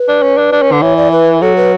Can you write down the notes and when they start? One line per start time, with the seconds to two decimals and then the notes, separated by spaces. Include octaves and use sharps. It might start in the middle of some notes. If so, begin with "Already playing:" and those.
Already playing: B4
0.08 D4
0.23 C#4
0.38 D4
0.52 D4
0.62 C#4
0.72 D3
0.82 E3 C#5
0.97 D5
1.12 B4
1.41 F#3 A4
1.56 B4